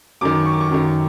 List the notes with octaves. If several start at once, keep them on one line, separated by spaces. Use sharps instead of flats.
F#2 D#3 D6
C#6
D6
C#6
F#2 D#3